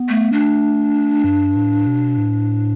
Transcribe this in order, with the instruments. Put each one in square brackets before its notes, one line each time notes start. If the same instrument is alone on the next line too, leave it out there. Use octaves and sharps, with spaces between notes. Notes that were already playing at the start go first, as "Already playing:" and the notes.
Already playing: [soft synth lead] B3
[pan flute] A3
[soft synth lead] A3 [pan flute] D4
[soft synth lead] G2
A2
B2
A2